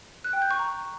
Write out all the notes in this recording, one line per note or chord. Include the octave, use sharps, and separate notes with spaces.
F#6
G5
G6
C#6
A#5